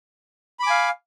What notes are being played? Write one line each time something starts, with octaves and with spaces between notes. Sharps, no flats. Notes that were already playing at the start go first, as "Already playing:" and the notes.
F5 G#5 B5 D6